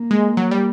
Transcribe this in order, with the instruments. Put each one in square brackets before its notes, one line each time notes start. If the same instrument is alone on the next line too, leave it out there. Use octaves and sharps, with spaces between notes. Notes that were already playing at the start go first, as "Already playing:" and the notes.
Already playing: [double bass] A#3
[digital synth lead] G#3
F#3
G3